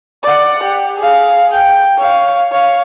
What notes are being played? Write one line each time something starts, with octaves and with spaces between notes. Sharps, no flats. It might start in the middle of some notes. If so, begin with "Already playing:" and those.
D5 F#5
G4
G#4 F5
G5
C#5 F5
C#5 F5